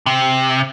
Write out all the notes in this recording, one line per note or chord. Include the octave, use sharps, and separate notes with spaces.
C3